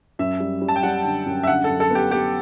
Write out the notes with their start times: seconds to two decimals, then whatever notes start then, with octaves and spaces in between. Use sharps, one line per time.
0.19 F#2 E5
0.40 G3
0.62 G3
0.69 A5
0.76 G5
0.83 G3 F#5
1.04 D3
1.26 F#2
1.43 E5
1.47 D3 F#5
1.64 A4
1.69 F#2
1.80 A4
1.90 B3 G4
2.11 B3 G4